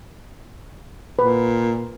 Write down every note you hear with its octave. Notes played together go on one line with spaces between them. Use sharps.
A#2 B4